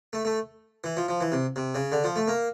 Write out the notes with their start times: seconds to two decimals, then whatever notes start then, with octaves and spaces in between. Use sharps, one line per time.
0.13 A3
0.25 A3
0.84 E3
0.97 F3
1.08 F3
1.21 E3
1.32 C3
1.56 C3
1.75 C#3
1.92 D3
2.04 F3
2.16 A3
2.28 A#3